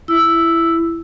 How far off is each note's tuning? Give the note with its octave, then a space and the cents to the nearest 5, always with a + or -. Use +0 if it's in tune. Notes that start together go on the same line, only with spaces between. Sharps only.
E4 +15 E6 +0